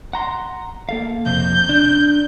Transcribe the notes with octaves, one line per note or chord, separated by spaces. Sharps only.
F#5 A#5 C6
A#3 A4 F5
F2 C3 C4 G6
D4